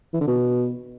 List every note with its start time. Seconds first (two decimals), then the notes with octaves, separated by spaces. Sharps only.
0.14 E3
0.21 D3
0.28 B2